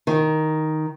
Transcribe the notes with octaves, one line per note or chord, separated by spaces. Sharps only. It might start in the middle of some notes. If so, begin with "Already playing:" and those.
D#3